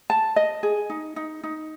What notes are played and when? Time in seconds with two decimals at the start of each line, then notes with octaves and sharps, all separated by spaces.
0.10 A5
0.36 D#5
0.63 G#4
0.90 D#4
1.16 D#4
1.43 D#4